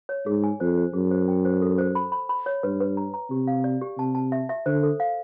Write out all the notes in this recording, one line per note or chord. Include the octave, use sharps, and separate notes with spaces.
C#5
G#2 G#4
G#5
F2 C5
C5
F#2 G#4
C5
G5
C5
A4
C5
B5
B5
B5
C#5
G2 B4
B4
A#5
A#5
C3 G4
F5
D5
G4
C3 A5
A5
E5
E5
D3 C5
A4
F5